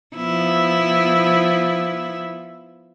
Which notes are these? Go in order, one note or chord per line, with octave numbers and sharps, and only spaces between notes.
F3 B3 E4